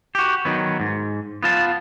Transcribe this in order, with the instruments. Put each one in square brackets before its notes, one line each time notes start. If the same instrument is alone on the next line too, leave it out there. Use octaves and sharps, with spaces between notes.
[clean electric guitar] F#4 G4
D#3 F#3 B3
G#2
B3 F4 A5